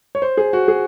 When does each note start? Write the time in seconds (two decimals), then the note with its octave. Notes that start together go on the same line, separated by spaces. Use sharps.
0.15 C#5
0.22 C5
0.37 G#4
0.53 F#4
0.68 G#4